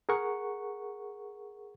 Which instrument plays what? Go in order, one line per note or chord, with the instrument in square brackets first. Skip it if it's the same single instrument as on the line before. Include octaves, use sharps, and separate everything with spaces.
[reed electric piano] G#4 A#4 F#5 C#6